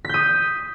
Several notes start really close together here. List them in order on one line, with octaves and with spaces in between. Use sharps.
B6 G6 D#6